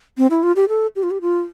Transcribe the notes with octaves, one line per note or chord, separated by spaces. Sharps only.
C4
E4
F4
G4
A4
G4
F4
G4
F4